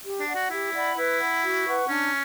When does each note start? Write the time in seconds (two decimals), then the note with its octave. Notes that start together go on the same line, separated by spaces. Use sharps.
0.04 G4
0.20 D4
0.27 D5 F#5
0.35 F#4
0.50 E4 G4
0.73 D5 F#5 B5
0.97 E4 B4
1.19 F#5 B5
1.43 F#4
1.66 B4 F#5 C#6
1.88 C#4 D4